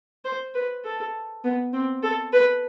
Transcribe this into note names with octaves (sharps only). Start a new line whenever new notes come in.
C5
B4
A4
B3
C4
A4
B4